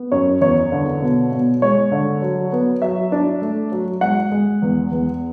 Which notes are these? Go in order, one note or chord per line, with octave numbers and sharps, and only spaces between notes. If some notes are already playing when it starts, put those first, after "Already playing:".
Already playing: B3
F#2 C#5
E2 C#5
D3
B2
B2
G#3 C#5
D3
F#3
B3
F#3 E5
D4
A3
F#3
G#3 F#5
G#3
E2
E2